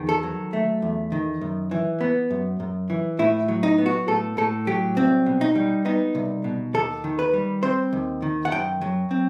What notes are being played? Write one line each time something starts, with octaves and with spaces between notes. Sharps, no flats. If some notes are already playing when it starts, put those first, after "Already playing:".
Already playing: E2 D#3
A4
F#3
A3
E2
D#3
F#2
E3
B3
F#2
F#2
E3
A2 E4
F#3
D#4
B3
F#4
A2 A4
A2 A4
F#3 G4
C2 C4
B2
D#4
G3
B3 D#4
C2
B2
D#2 A4
D#3
B4
G3
C4 C5
D#2
D#3
F#5
F#2 G5
F#3
C4